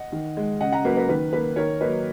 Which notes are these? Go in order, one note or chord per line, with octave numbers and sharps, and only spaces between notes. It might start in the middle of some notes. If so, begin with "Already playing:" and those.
Already playing: D#5 F#5
D#3
G#3
C#3 D#5 F#5
F#5 A#5
F#3 A#3 B4
B4
D#3 B4
A#3 B4
D#3 A#4 C#5
F#3 A#3 B4 D#5